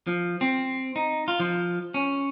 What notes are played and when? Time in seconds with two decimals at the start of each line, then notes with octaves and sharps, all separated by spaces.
0.07 F3
0.41 C4
0.96 D#4
1.28 F4
1.40 F3
1.94 C#4